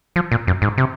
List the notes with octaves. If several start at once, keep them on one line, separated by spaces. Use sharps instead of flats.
F3
A#2
F#2
G#2
C3